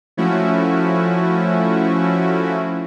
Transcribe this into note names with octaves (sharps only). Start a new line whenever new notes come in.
F3 A3 C#4 E4 F#4